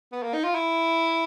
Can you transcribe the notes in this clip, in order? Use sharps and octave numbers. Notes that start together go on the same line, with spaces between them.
B3
A#3
D#4
F4
E4